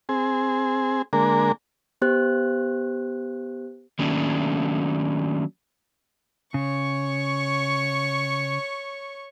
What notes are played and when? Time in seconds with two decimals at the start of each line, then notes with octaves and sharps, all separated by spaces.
0.09 C4 G#4
1.13 D3 G#3 A#3 A#4
2.02 B3 G4 C5 F#6
3.99 D#3 F#3 A3 A#3 C#4 D4
6.54 C#3 C#5 C#6